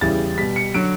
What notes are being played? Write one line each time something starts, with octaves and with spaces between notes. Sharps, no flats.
E2 C#3 E3 G3 A6
B2 G3 B6
C#7
D3 F#3 D7